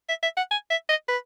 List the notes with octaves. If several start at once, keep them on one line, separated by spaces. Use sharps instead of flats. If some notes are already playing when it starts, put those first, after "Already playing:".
E5
E5
F#5
G#5
E5
D#5
B4